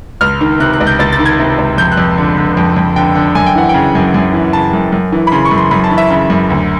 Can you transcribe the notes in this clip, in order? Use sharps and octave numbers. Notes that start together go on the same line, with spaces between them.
C#2 F6
D#3
C3 F#6
F#6
C#2
G6
C#2 A6
A6
D#3
G#6
C3
C#2
F2 G6
F#6
F2
D3
D3
F2
F2
D3 G5
D3
F#2 G#5
G5
E3 F#5
C#3 G5
F#2
F#2
E3
C#3 A5
F#2
F#2
E3
B5
C#3 C6
C#6
F#2
C6
F#2 B5
A5
E3
E5
C#3 E5
F#2
D2